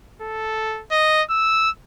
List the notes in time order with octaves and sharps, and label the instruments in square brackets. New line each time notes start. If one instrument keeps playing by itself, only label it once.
[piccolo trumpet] A4
D#5
E6